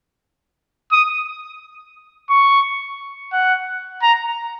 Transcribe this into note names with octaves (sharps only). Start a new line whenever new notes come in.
D#6
C#6
F#5
A#5